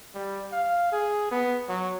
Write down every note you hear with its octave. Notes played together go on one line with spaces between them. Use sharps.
G3
F5
G#4
B3
F#3